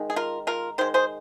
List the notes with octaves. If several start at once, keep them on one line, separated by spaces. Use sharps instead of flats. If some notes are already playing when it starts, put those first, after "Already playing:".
Already playing: D#3 G#3
G#4
F4 A#4
F4 A#4
D#3 G#3 C5
G#4 C5